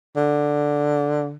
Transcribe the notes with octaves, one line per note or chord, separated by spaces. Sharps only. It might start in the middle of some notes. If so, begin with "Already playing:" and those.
D3